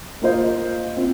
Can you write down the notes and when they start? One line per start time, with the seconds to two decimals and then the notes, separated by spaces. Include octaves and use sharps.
0.22 A#3 F4 C5 D#5
0.97 C4 F4